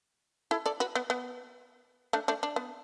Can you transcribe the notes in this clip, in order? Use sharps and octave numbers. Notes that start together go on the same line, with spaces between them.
E4 A4
A4 D5
F#4 B4
B3
B3
A3 D4
A3 D4
D4
B3